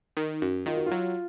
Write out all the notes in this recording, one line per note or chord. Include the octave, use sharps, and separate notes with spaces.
D#3
F#2
D#3 F4
F#4
F#3 F4